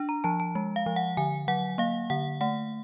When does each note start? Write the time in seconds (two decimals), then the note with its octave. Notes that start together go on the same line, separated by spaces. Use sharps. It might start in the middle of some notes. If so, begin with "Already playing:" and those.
Already playing: D4
0.09 A#5
0.24 F3 A5
0.40 A5
0.55 G#3
0.76 F5
0.86 F3
0.96 F#5
1.17 D3 G#5
1.48 F#3 F#5
1.78 A#3 F5
2.10 D3 F#5
2.41 A3 F#5